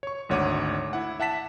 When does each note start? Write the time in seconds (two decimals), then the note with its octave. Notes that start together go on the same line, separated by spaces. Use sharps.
0.03 C#5 C#6
0.29 G#1 D2 C#5 F#5 D6 D#7
0.93 E4 F#5
1.20 E5 F#5 A5 B6 E7